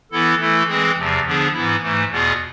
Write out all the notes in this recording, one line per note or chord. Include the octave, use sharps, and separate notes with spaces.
E3 B3 E4 A4
E3 A3 E4 A4
E3 G#3 C4 G#4
E2 C3 F3
D3 F3 B3 D4 G#4
G#2 E3 B3 E4
G#2 E3 A3
E2 B2 B3 F4 G#4